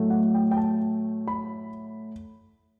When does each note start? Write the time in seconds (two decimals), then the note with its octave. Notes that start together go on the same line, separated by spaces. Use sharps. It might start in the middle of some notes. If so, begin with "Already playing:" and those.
Already playing: A2 F#3 A3
0.10 F#5
0.35 G5
0.51 G5
0.57 A5
1.28 B5